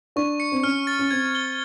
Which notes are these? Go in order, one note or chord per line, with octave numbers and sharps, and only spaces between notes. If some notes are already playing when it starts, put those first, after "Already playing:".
D4 C#6
C#7
C4
C#4 F6
A6
C#4
C4 G#6
G7